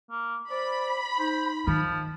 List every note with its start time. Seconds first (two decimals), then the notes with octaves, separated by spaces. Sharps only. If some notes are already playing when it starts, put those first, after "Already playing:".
0.11 A#3
0.50 C5 D5 B5
1.19 D#4 C5
1.67 D#3 F3